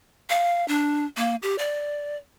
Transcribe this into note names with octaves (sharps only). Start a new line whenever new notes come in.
F5
D4
A#3
G4
D5